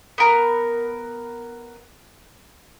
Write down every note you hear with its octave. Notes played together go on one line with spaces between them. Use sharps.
B3 A#4